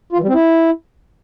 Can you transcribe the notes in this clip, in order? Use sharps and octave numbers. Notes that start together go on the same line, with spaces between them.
F4
E3
G3
C4
E4